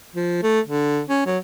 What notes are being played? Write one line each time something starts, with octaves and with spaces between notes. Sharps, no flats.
F3
A3
D3
C#4
F#3